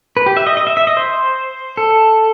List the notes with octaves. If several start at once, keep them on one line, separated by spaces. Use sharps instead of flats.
B4
G4
E5
D#5
D#5
E5
E5
D#5
C5
A4